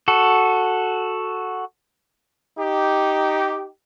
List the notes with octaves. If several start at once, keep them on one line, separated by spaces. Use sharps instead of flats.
F#4 A4
D#4 G4